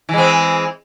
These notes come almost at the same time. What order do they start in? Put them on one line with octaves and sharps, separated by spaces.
E3 G#3 C4